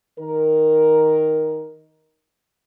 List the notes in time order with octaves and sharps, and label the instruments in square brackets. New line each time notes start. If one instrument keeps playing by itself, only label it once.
[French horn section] D#3 A#4